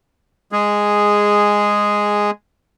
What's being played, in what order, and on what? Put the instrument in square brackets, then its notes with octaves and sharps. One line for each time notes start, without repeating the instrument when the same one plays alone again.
[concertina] G#3 G#4